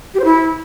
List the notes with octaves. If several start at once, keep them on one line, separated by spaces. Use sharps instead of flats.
G4
C5
E4